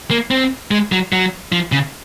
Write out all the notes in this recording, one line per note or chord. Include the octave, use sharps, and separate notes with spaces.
A#3
C4
G#3
F#3
F#3
F3
C#3